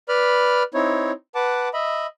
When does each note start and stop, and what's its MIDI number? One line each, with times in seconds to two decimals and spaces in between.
0.09 0.63 71
0.09 0.63 74
0.09 0.63 83
0.09 0.63 89
0.74 1.12 60
0.74 1.12 63
0.74 1.12 64
0.74 1.12 73
1.35 1.69 71
1.35 1.69 78
1.35 1.69 81
1.35 1.69 86
1.74 2.06 75
1.74 2.06 76
1.74 2.06 83